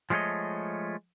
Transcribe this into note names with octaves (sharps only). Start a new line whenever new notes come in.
F3 G#3 A3 B3 C#5 D#5